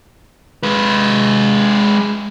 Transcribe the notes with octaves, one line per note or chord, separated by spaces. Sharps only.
G#3 B4